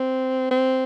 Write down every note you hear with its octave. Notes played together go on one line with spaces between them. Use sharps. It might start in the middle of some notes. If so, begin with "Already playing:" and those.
Already playing: C4
C4